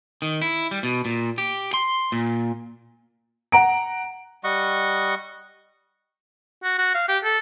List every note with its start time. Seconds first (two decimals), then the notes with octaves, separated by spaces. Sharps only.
0.22 D#3
0.42 E4
0.71 G3
0.83 B2
1.05 A#2
1.38 G4
1.74 C6
2.12 A#2
3.52 F#5 A#5 D7
4.44 G3 D#5 F#5 C#6
6.64 F#4
6.78 F#4
6.95 F5
7.08 G4
7.24 A4